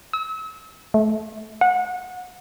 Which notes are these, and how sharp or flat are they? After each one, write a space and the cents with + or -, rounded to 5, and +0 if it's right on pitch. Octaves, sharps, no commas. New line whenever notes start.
E6 -40
A3 -25
F#5 -25